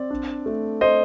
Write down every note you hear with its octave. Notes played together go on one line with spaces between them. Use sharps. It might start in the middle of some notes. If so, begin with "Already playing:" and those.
Already playing: C4 D5
D4
A3
A3 C5 D#5